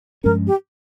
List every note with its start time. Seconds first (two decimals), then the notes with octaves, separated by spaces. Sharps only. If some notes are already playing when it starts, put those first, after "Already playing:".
0.24 G2 F3 G#3 C#4 A#4
0.47 G4